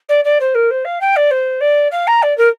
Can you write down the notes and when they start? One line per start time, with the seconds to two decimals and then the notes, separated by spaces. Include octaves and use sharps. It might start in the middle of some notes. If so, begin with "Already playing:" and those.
0.09 D5
0.24 D5
0.40 C5
0.54 A#4
0.70 C5
0.84 F5
1.00 G5
1.16 D5
1.31 C5
1.60 D5
1.91 F5
2.07 A#5
2.22 D5
2.37 A#4